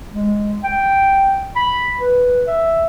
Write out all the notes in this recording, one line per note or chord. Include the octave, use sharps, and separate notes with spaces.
G#3
G5
B5
B4
E5